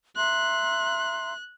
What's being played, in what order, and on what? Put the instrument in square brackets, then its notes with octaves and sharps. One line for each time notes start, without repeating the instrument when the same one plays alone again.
[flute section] E5 A#5 C6 [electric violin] F#6